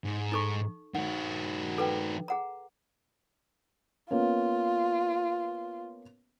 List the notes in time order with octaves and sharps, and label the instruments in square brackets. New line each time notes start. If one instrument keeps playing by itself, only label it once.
[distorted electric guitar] G#2
[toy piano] D#4 A4 C#6
[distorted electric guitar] D#3 F#4 [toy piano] F#5
[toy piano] A4 B4 G5
G#4 F#5 A#5
[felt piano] A#3 B3 C#4 [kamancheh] F4